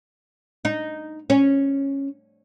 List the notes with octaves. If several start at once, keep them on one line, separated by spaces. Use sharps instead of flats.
D#4
C#4